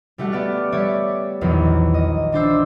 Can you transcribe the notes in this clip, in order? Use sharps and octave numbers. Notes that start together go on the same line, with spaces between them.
G3 A3 F#4 F#5
B3 D5 F6
G3 C#5 D5 E5 C#6 D7
A#1 E2 D#3 E3 F#3 A#3
D#5
E3 D4 C5 E6